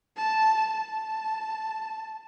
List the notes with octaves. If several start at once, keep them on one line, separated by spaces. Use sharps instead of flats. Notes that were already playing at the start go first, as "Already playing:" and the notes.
A5
A5